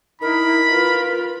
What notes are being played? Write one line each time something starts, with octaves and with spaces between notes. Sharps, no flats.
D#4 E4 A#4 B5
F4 B4